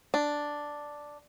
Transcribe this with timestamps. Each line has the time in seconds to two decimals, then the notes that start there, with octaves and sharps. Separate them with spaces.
0.14 D4